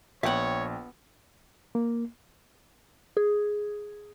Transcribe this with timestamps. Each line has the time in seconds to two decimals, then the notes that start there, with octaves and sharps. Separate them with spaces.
0.23 A#1 B3 C#5 E5 F#5 G5 B5
1.75 A#3
3.17 G#4